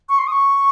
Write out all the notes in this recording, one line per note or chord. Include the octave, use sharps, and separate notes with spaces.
C#6
C6
D#6
C#6